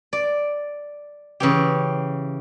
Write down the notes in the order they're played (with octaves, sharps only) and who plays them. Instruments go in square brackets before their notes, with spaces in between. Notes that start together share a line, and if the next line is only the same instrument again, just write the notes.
[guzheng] D5
C#3 E3 G4